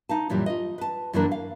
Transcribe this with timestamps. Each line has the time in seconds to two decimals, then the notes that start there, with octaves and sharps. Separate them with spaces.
0.09 D#4 F5 A5
0.30 F#2 A#2 E3 G3
0.46 F4 D#5
0.78 B4 A5
1.13 F#2 D3 E3 A#3 D4 A#4
1.31 F5